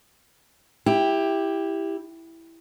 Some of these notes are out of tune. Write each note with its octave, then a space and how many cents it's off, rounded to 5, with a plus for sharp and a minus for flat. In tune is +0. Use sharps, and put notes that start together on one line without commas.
E4 +0 G4 +10